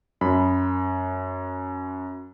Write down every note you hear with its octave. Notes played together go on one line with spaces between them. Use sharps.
F#2 B5